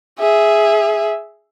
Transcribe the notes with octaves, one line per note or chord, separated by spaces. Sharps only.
G#4 E5